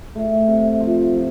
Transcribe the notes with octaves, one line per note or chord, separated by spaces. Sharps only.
A3
C3
F3
F3